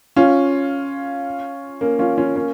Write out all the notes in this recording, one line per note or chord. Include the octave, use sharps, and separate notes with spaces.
C#4 F4
A#3 C#4
C#4 F4
C#4 F4
A#3 C#4